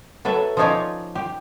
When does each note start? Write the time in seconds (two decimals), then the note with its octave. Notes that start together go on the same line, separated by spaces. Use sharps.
0.25 F#3 A4 B4 E5
0.57 F3 C#4 D#4 F4 C#5 D5
1.15 G4